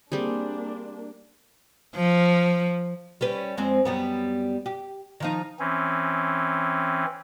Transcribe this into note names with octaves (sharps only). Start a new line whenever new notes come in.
G3 A#3 C4 D4 G#4
F3
G3 C#4 B4
F2 G#3 C4
F#2 G3 B3
G4
D#3 F3 D#4
E3 C4 C#4